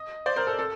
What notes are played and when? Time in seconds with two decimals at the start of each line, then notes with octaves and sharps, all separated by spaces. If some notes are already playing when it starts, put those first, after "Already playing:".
Already playing: D#5
0.26 C5 D5
0.36 A#4 C5
0.47 A4
0.59 A4